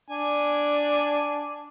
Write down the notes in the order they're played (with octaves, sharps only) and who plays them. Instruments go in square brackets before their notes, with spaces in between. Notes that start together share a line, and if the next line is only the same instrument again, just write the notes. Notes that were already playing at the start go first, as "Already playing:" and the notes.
[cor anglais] D4 [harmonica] G#5